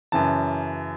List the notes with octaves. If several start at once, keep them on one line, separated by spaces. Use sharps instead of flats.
F#2 C#3 E3 A5